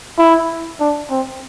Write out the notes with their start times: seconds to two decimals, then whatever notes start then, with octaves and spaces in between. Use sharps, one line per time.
0.18 E4
0.80 D4
1.10 C4